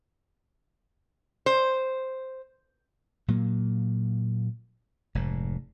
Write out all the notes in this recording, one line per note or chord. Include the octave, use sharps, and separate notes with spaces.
C5
A#2 F#3 A#3
F1 G#2